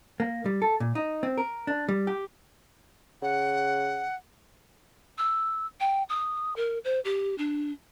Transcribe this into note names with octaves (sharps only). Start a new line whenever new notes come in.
A#3
G3
A4
A#2
D#4
C4
A#4
D4
G3
G4
C#3 F#5
E6
G5
D#6
A#4
C5
G4
D4